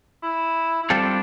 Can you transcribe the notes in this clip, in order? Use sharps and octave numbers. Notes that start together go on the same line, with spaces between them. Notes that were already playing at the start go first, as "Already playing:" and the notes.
E4
E4
G3 C4 D4 F4 A4